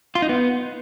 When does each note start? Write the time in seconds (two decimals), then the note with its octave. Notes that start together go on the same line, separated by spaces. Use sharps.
0.15 F4
0.22 D#4
0.29 B3